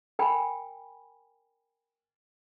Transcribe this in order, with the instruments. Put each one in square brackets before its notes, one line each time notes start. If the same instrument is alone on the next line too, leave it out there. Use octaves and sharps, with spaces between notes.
[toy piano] A#4 G5 G#5 B5